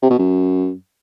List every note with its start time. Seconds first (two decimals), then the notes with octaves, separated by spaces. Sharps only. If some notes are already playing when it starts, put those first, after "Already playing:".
0.02 C3
0.10 B2
0.18 F#2